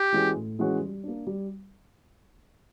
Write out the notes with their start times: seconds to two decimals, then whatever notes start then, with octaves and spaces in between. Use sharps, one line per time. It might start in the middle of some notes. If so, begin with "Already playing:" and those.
Already playing: G4
0.12 E3 G#3 C#4 F#4
0.36 A2
0.59 E3 G#3 C#4 F#4
0.81 G3
1.03 A#3 D4
1.27 G3